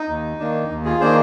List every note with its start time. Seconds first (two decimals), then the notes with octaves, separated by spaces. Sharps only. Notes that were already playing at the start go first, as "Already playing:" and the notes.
Already playing: D#4
0.09 D#2
0.40 D#3 A#3 D4
0.69 D#2
0.85 F4 G#4
1.00 D#3 A#3 D4 G#4 C5